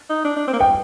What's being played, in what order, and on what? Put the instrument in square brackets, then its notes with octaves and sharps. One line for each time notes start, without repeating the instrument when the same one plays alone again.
[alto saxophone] D#4
D4
D4
C4
A#3
[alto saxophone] B3 [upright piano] G5